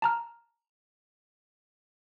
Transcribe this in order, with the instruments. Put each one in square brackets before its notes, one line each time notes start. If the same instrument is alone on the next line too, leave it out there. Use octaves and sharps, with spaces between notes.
[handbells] A5 A#5 F6